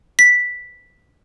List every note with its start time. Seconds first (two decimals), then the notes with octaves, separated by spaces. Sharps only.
0.19 B6